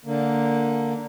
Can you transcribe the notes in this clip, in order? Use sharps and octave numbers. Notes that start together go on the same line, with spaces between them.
D3 A#3